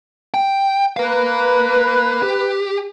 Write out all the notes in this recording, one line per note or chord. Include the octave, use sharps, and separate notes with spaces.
G5
A#4 B4 F5
G4